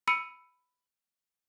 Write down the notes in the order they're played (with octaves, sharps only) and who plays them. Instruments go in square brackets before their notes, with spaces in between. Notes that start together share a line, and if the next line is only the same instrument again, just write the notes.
[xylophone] B5 E6 C#7 D#7